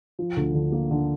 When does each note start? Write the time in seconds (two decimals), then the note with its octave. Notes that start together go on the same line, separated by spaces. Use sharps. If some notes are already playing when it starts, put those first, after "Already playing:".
0.19 F3
0.37 D2
0.54 D3
0.72 A#3
0.91 D3